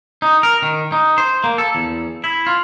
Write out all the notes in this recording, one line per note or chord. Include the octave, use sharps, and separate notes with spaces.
D#4
A#4
D#3
D#4
C5
A#3
A4
E2
E4
F4